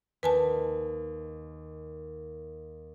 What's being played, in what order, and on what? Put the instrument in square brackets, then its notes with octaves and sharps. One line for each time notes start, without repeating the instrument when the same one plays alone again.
[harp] D#2 [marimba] B4 G#5 A5